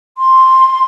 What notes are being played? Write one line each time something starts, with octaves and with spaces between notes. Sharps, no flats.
C6